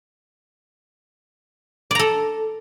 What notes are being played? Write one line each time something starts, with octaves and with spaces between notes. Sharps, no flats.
A4 D5 A#5